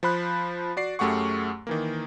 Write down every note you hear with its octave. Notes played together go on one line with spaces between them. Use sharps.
F3 C5 B5 F#6
F#4 D5 C7
F#2 A3 G4 G#4 F#5 C#6
D#3 E3 A#3